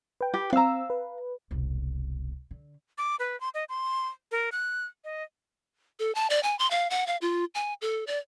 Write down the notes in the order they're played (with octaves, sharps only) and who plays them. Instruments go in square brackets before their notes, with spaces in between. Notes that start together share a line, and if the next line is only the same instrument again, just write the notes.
[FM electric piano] B4 G5
[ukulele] G4
[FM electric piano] C4 E6 [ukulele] F5 A#5
[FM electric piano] B4
[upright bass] E1 C2
D3
[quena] D6
B4
C6
D#5
C6
A#4
F#6
D#5
[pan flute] A4
A5
D5
G#5
C6
F5
F#5
F5
F4
G#5
A4
D5